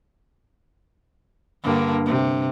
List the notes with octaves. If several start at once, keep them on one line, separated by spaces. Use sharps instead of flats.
G2 D3 A#3
C3